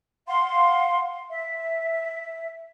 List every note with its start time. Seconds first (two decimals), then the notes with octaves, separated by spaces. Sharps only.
0.27 F5 F#5 C6
1.30 E5